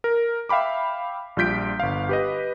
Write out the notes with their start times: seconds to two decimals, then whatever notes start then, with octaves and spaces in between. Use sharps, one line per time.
0.04 A#4
0.49 E5 F5 G5 B5 D6
1.37 A#1 G3 F4 G6 B6 D7
1.80 G1 F5
2.09 G4 B4 D#5